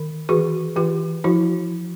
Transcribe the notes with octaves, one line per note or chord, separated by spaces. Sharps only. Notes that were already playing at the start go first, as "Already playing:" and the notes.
Already playing: D#3
E3 F#4 G#4
E3 F4 G4
F3 E4 F#4